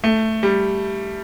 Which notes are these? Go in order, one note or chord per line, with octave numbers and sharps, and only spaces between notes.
A3
G3